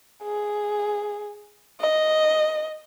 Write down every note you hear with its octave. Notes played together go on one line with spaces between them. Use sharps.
G#4
D#5